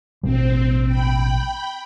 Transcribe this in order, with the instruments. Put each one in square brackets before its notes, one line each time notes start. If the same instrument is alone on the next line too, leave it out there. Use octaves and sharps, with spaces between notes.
[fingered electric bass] A1 B2 G3 [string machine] C4
[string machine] G5 B5